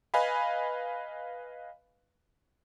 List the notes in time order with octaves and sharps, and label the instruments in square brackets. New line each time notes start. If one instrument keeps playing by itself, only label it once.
[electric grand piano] B4 D#5 F5 G#5 B5